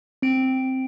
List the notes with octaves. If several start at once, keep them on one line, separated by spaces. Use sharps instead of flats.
C4 D7